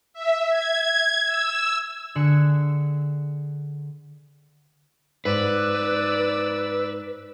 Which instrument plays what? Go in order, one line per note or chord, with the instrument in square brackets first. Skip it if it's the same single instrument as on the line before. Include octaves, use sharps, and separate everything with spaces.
[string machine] E5
G#6
E6
[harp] D3 G#4 F#6 C#7
[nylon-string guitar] G#2 [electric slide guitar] B4 [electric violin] D5 E6